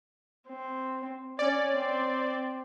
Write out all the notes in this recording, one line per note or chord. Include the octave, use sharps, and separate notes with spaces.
C4
C#4 D5
C4